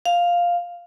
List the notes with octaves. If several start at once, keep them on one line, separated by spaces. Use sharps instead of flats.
F5